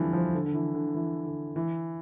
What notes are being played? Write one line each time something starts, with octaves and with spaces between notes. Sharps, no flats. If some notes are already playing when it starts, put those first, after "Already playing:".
Already playing: D3 E3 F3 G3 C4
F3
D3
D3
E3
D3
E3
D3
E3